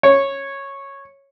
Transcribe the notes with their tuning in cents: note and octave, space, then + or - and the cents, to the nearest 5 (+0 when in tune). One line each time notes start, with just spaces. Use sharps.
C#5 -10